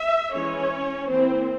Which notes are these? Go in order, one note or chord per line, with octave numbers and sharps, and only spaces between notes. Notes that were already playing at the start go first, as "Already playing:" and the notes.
Already playing: E5
E3 G#3 C#4 E4 C#5
E3 A#3 C4 E4 C5